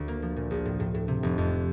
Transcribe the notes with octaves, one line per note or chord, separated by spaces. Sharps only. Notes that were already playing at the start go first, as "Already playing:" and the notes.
Already playing: D2
A#3
F3
A#2
A#1
A2
A2
A2
C3
F1
F2